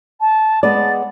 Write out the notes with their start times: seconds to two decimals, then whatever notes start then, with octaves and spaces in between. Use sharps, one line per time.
0.20 A5
0.63 G#3 B3 D5 A6